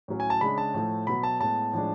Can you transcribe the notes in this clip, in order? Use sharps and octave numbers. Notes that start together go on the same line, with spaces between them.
A2 F#3 C#4
G#5
A5
C#3 G#3 D4 B5
A5
A2 F3 A3
B2 F#3 B3 B5
A5
A2 G#3 B3 A5
A2 F3 G#3 D4